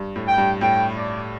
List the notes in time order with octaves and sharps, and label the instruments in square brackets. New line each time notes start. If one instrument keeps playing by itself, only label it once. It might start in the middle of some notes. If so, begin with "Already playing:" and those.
Already playing: [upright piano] G2
A2
[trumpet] G5
[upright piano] G2
[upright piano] A2 [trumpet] G5
[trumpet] D5